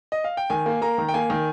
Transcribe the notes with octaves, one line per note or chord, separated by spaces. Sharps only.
D#5
F5
G5
D#3 G#5
A#3
A#3 A#5
D#3
G5
A#3 G#5
D#3